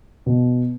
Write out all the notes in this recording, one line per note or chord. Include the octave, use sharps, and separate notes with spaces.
B2